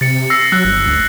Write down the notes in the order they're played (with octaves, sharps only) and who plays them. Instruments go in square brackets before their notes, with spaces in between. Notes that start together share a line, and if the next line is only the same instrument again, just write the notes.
[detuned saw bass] C3 [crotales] A6 C#7
[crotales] E6 A#6 C7
[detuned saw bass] F#3 [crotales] E6 F#6
[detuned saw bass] G1
D2